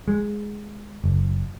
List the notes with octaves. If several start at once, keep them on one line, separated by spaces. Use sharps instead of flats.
G#3
F#1